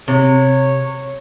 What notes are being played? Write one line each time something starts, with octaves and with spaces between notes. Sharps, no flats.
C3 C#5